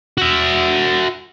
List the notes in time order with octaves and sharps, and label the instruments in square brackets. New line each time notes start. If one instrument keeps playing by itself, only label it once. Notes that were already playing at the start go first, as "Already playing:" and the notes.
[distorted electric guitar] F#4 E5